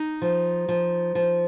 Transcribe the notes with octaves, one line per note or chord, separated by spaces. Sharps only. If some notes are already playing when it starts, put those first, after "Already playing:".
Already playing: D#4
F3
F3
F3